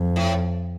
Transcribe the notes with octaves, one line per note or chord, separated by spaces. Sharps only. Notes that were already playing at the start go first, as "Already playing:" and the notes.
Already playing: F2
A2